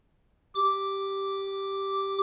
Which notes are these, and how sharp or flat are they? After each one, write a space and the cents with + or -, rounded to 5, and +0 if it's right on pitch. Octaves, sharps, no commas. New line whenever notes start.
G4 -5 D6 +0